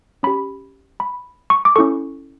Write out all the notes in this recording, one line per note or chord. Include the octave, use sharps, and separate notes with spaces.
C#4 G4 B5
B5
C#6
D6
C#4 E4 A4 C#6